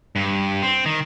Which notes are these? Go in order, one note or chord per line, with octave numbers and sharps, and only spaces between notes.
G2
C4
D#3